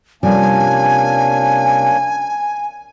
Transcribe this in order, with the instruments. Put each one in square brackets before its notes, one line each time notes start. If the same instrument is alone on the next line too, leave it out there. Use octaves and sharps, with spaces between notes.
[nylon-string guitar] C3 F3 G3 [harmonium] A#3 C#4 D4 [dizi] G#5